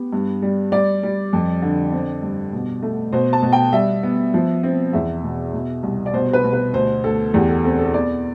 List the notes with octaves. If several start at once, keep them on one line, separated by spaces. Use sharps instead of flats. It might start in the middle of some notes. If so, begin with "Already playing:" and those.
Already playing: B3 G4
G2
G3
G3 D5
G3
F2
D3
C4
G2
B2
A3
B2 C5
A5
B2
G5
G3 E5
B3
F3
C4
E2 E5
B2
B2
C2
D5
B2 C5
B4
B2
B4
D2 C5
D2 A4
E2 G4
A4
C4 A4
A4
B3 D5